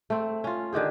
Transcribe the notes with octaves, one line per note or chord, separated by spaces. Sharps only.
A3 C4
C#4 F4
D3 D#3 G4 G#4